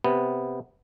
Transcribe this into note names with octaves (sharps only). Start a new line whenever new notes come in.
C3 B3